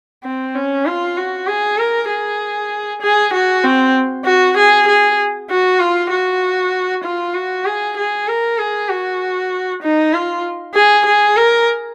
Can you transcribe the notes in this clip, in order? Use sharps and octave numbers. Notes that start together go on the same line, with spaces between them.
C4
C#4
F4
F#4
G#4
A#4
G#4
G#4
F#4
C4
F#4
G#4
G#4
F#4
F4
F#4
F4
F#4
G#4
G#4
A#4
G#4
F#4
D#4
F4
G#4
G#4
A#4